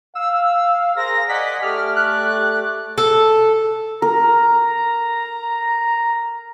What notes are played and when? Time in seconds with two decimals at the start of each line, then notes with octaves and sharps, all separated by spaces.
0.15 F5 E6
0.97 G#4 A#4 C5 A#6
1.29 D5 D#5 F#5 G#5 B6
1.63 A3 G4 D5 F6
1.96 F#6
2.98 A4
4.02 A#4 A#5